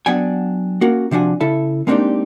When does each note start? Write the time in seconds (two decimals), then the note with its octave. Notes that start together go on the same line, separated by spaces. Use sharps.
0.06 F#3 B3 D4 G5 G#5
0.81 A#3 C#4 F#4 A#4
1.11 C3 F3 D4 F#4 G#5
1.40 C#3 E4 A4 E5 A5
1.87 G#3 A#3 C4 D4 D#4 G4